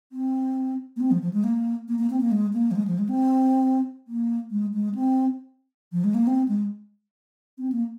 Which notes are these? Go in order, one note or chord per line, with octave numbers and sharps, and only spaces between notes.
C4
A#3
C4
F3
F3
G#3
A#3
A#3
A#3
C4
A#3
G#3
A#3
F3
G#3
F3
G#3
C4
A#3
G#3
G#3
C4
F3
G#3
A#3
C4
G#3
C4
A#3